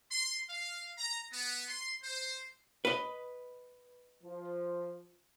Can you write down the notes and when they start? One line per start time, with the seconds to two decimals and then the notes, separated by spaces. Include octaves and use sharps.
0.10 C6
0.50 F5
0.98 A#5
1.32 B3
1.68 C6
2.03 C5
2.85 B4 D#5
4.23 F3